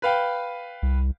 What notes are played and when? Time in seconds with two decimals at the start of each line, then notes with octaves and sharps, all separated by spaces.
0.02 B4 F5 G5
0.82 C2